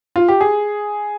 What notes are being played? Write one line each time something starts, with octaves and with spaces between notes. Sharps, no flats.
F4
G4
G#4